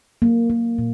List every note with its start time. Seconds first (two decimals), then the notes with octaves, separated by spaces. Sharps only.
0.22 F#3 A#3
0.50 A#3
0.78 A#2